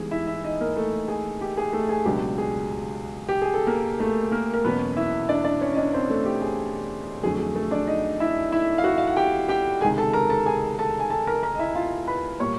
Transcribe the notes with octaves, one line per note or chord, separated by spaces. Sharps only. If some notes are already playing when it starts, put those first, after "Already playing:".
Already playing: G#2 E3 G3 B3 G#4 G#5
E4 E5
E4 E5
D#4 D#5
A#3 A#4
A3 A4
G#4
G4
G#4
A3 A4
G#4
C#2 B2 F#3 B3 D4 G4
G#4
G4
G#4
A4
A#3 A#4
A3 A4
A#3 A#4
A#4
E2 B2 F#3 A#3 B3 C#4 B4
E4 E5
D4 D5
D4 D5
C#4 C#5
D#5
D4 D5
C4 C5
A3 A4
G4
G#4
F2 D3 F#3 A3 G#4
G#4
A3 A4
D4 D5
D#4 D#5
E4 E5
E4 E5
F5
F#4 F#5
F5
F#5
G4 G5
G4 G5
C#2 C3 D#3 G#4 G#5
A4 A5
A#4 A#5
A4 A5
G#4 G#5
A4 A5
G#5
A4 A5
A#4 A#5
A#4 A#5
D#5
E4 E5
F4 F5
B4 B5
A#2 G3 A#3 C#5 C#6